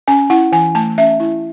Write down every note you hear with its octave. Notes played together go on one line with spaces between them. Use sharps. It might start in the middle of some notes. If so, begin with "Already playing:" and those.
C#4 G#5
E4 F#5
E3 G#5
A3 A5
C#4 E5
E4